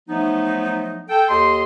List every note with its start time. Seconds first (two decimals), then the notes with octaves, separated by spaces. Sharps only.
0.09 F3 F#3 A3 B3 D#4
1.09 A4 G5
1.29 D#2 G4 A4 D#5 C6